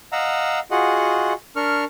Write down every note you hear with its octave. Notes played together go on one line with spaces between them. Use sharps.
D#5 F5 F#5 A#5 E6
F4 F#4 G#4 D#5 F#5
D4 A#4 C#6 F6